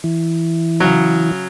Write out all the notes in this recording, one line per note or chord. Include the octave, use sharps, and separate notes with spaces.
E3
C#3 F#3